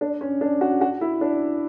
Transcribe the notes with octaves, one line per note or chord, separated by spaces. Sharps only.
D4
C#4
D4
F#4
F#4
E4
D4